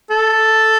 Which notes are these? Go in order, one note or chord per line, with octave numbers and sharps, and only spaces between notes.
A4